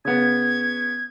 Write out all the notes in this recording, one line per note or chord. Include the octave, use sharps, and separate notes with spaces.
C#3 B3 G#6